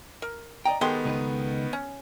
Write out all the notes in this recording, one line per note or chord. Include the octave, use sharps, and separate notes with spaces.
A#4
D5 D#5 G5 A#5
D#3 G#3 B3 G4 A4 C6
C#2 D#4 B4
C#4